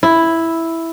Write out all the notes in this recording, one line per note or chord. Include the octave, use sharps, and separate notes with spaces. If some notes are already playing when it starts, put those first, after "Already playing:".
E4